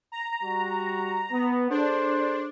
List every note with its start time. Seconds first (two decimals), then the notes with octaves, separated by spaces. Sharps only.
0.12 A#5
0.42 G3 F#4
1.31 B3
1.70 D4 G#4 A4 C5